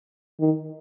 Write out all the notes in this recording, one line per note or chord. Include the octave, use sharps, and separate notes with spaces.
D#3